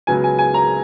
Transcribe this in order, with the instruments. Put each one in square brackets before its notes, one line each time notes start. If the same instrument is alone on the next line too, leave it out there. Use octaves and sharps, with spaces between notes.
[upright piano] C#2 C#3 F#3 B3 G#5
G#5
G#5
A#5